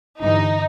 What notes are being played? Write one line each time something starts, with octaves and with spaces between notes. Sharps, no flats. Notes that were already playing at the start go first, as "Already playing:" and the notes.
G1 G2 E3 D#4